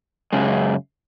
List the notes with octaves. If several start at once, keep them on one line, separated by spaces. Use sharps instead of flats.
F#2 C#3 G#3